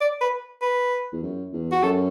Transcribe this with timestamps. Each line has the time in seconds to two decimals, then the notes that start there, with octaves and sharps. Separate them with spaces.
0.01 D5
0.21 B4
0.62 B4
1.12 E2
1.22 F#2
1.53 E2
1.72 F#4
1.83 F#2 A4